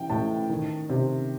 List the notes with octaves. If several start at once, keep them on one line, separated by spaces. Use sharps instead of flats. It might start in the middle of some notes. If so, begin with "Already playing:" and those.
Already playing: E3 G5
A2 A5
D#3
C3